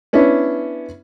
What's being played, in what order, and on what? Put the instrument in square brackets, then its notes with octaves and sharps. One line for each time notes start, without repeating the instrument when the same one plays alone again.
[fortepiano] B3 C#4 D4 E4